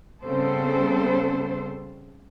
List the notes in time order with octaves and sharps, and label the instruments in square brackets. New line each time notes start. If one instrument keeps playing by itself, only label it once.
[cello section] C#3 G3 B3 C4 A4 C5